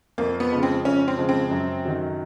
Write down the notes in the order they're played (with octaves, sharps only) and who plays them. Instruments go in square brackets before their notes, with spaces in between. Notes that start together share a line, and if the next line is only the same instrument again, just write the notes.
[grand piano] F2 [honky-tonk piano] A#3
[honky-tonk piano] B3
[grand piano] C#3 F3 G#3
[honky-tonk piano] C4
[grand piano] F2 [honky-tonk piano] C#4
[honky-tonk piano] C4
[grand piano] C#3 F3 G#3
[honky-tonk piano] C4
[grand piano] F#2
D#3 F#3